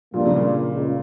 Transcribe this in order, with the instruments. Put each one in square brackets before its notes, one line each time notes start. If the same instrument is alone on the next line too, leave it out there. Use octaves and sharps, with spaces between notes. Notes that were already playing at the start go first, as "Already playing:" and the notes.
[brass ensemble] G2 F3 A#3 D4 F4 [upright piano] A#2
[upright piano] C#3
A#2
[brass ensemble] C#2